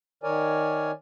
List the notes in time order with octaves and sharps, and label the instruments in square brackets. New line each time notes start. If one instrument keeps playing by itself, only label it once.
[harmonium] D#3 A#4 C#5 D5 G#5